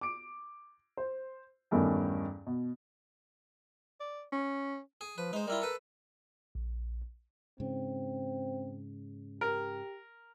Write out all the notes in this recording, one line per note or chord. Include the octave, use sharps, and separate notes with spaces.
D6 D7
C5
E2 G2 D#3 A3 C#4
B2
D5
C#4
G#4
F3 B4
G#3 D#4 C5
G3 E4 F4 A#4
A4 B4
A#1
G#2 C#3 C4
G4 A#4